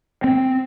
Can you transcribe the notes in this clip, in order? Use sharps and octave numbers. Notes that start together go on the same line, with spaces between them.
C4